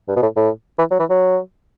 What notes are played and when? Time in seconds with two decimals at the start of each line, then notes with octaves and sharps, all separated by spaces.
0.08 G2
0.16 B2
0.22 A2
0.36 A2
0.78 E3
0.91 F#3
0.99 E3
1.10 F#3